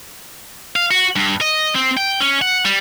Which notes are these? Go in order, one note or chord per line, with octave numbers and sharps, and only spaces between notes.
F5
F#4
G2
D#5
C4
G5
C#4
F#5
G3